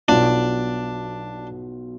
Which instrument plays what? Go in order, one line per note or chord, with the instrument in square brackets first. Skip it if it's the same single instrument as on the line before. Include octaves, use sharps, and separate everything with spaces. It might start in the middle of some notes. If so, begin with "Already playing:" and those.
[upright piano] B1 B2 B3 F4 [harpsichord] D4